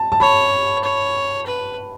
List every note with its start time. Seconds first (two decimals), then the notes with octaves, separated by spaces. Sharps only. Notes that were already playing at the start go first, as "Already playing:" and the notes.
Already playing: A5
0.12 A5
0.20 C#5 B5
0.83 C#5
1.47 B4